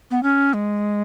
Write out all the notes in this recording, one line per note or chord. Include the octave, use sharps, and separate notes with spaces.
B3
C#4
G#3